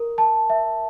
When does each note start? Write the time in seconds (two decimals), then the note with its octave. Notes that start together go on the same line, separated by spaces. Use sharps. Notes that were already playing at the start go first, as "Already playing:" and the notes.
Already playing: A#4
0.18 A5
0.50 E5